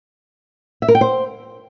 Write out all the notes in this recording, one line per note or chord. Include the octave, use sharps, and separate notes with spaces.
E5
A#4
G5
C5